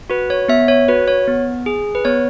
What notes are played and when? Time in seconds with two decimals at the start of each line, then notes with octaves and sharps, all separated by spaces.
0.10 F#4 B4
0.30 C#5
0.49 B3 E5
0.68 C#5
0.88 F#4 B4
1.08 C#5
1.27 B3
1.66 G#4
1.95 B4
2.05 B3 C#5